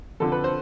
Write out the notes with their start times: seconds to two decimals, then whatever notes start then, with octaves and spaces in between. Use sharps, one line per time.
0.20 F2 D3 F3 A4
0.32 B4
0.44 C5